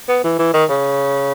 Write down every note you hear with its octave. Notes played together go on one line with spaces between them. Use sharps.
B3
E3
E3
D#3
C#3